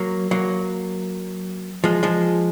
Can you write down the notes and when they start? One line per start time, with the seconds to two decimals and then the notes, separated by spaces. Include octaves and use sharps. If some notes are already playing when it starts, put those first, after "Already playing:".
Already playing: F#3 A#3
0.31 F#3 A#3
1.84 F3 G#3
2.03 F3 G#3